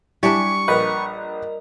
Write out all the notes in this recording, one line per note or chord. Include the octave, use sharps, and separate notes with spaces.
G3 D4 E4 G#5 C#6 D6
A#1 A#4 B4 D#5